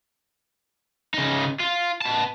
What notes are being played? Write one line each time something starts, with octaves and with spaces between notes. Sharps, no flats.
C#3 D#4
F4
B3 A5